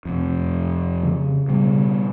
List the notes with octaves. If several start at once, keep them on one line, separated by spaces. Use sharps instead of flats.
F2 C3
C#3
B2 G3